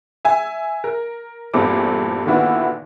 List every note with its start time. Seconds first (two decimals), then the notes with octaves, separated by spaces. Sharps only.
0.25 E5 G#5
0.84 A#4
1.54 E2 G2 A#2 A3 C4 D6
2.26 A#2 D3 D#3 B3 E4 F#4